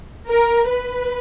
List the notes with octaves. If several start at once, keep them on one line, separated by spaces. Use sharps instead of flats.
A#4
B4